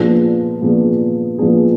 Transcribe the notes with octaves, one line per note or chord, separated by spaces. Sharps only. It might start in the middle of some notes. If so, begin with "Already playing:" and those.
Already playing: A#2 F3 B3 D4 G#4
A#2 F3 B3 D4 G#4
A#2 F3 B3 D4 G#4